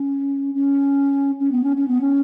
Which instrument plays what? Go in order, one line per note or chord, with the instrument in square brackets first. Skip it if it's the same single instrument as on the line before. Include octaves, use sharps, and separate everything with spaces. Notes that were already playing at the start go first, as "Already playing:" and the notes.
Already playing: [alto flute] C#4
C#4
C#4
B3
C#4
C#4
B3
C#4